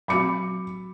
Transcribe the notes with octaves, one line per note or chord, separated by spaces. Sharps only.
F#3 C4 F#4 B5 D6 C#7